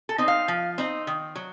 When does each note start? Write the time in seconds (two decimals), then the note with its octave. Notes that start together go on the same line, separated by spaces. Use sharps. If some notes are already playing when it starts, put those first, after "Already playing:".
0.09 A4
0.18 C4 D#4
0.28 F5
0.48 F3
0.78 C4 D#4
1.07 D#3
1.35 F#3